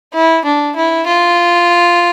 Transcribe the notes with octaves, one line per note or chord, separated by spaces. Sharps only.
E4
D4
E4
F4